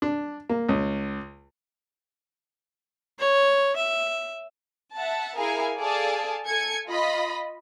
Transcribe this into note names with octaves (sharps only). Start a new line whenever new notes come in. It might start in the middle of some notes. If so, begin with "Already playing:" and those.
D4
A#3
C#2
C#5
E5
E5 F#5 A5
E4 G#4 A#4 F5 G#5
G#4 A4 D5 F5 G#5 A5
A4 G#5 G#6 C#7
F4 D#5 B5